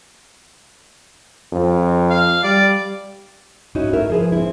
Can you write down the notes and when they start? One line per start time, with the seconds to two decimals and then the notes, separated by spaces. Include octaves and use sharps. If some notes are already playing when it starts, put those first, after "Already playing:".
1.52 F2
2.10 F5
2.43 G3 D5
3.75 C#4 D#4 E4 F#4
3.93 A3 E4 A#4 E5
4.10 F3 G#4 B4
4.32 C4 E4